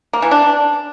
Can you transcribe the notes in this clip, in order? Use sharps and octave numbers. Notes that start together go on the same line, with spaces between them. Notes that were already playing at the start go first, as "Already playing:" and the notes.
A#3
E3
D4